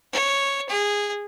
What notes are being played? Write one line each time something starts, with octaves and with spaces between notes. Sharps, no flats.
C#5
G#4